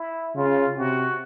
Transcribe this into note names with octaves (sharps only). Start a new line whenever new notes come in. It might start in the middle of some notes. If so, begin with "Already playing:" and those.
Already playing: E4
C#3 F4
C3 F#4